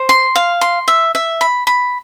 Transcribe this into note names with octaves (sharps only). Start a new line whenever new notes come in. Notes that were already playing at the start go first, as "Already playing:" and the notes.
Already playing: C5
C6
F5
C6
E5
E5
B5
B5